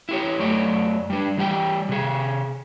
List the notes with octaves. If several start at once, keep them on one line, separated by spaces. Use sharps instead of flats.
E4 G4 C#5
F#2 A3 C#5 D5
G3 D4
E3 G3 G4 F#5 G5
C3 G#4